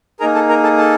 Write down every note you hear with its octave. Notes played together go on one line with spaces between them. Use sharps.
A#3 D#4 G#4 A#4 A#5
A4 A5
A#4 A#5
A4 A5
A4 A5